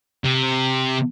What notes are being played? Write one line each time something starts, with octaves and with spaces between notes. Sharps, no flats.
C3